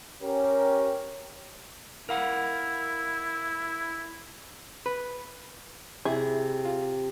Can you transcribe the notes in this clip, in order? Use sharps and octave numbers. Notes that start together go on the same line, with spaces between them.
C#4 G4 A#4 C#5
E4 A#4 F5 F#5
B4
C3 E4 G#4
F4